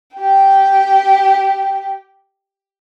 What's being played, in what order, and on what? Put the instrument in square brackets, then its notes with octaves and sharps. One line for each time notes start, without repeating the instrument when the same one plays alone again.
[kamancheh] G4 G5